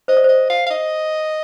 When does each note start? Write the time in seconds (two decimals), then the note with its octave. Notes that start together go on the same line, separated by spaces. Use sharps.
0.08 C5 D#5
0.17 D5
0.24 C5 D#5
0.50 F5
0.67 F5
0.71 D#5